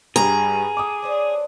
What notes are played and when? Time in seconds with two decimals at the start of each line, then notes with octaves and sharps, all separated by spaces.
0.16 G2 G3 G#4 A#4 A#5
0.77 F4 A4 D6 D#6
1.02 C#4 D4 C5